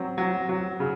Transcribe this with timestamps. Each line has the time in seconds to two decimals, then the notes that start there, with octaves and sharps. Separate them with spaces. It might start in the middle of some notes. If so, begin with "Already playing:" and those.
Already playing: F#3 C4
0.18 F#3
0.49 F#3
0.80 C#3